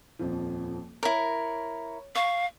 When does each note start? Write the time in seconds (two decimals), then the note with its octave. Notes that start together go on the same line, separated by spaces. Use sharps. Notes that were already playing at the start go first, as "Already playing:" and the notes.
0.19 D#1 F2 F3
1.03 E4 A#4 C#5
2.15 F5 C#6